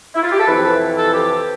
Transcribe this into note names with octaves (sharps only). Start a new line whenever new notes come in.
E4
F4
G4
A4
F2 C3 E3 B4
A4
G4